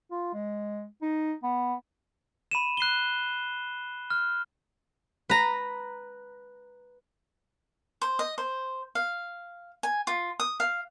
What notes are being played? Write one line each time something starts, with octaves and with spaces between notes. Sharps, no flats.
F4
G#3
D#4
B3
B5 D#7 E7
F#6 C7 D#7 G7
F6
B4 A#5
C5
D#5
C5
F5
G#5
F4
D#6
F5